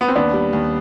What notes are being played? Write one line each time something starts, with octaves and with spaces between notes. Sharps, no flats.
B3
C4
D#2 B3 D4
G3
D#2